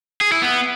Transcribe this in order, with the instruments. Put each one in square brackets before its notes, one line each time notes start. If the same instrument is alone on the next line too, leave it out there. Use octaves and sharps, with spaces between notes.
[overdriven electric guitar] G#4
E4
B3